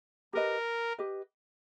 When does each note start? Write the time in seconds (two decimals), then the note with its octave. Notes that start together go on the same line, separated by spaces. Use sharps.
0.33 G4 A#4 B4 D#5
0.98 G4 B4 D#5